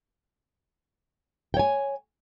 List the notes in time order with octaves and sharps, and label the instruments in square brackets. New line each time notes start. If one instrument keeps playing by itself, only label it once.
[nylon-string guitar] G5
C#5
G#5